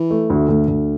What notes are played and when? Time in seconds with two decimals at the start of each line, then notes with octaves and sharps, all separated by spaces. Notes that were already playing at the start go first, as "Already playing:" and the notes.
Already playing: E3
0.11 A3
0.30 D2
0.49 D2
0.68 D2